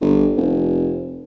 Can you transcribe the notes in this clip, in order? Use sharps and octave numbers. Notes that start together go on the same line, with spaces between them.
G1
F1